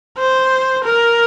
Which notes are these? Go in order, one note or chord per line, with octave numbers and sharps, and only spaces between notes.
C5
A#4